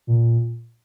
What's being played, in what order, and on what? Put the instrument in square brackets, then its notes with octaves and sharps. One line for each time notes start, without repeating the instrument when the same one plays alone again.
[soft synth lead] A#2